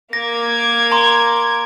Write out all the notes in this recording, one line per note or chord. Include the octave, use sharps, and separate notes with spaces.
A#3 D6 G#6 A#6
A#5 C6